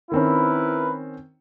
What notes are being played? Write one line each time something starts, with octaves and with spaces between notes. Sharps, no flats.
D#3 C4 C#4 E4 A#4 B4